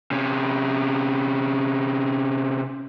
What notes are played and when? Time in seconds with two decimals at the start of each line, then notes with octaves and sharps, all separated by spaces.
0.11 C3 C#4